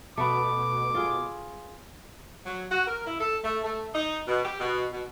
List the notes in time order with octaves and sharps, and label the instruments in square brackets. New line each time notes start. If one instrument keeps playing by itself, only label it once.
[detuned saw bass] B2 [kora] A3 B3 [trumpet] D6
[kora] F4 G#4
[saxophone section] F#3
F#4
A#4
E4
A4
A3
A3
D#4
B2
G4
B2
B2